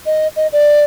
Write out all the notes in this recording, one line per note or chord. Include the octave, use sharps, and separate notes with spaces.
D#5
D#5
D5